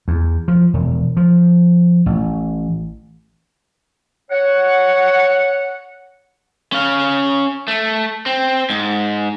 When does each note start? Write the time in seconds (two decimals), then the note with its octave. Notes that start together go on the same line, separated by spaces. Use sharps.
0.08 E2
0.48 F3
0.74 E1
1.17 F3
2.06 A1
4.31 C#5 F#5
6.72 C#4 F5
7.68 A3
8.26 C4
8.70 G#2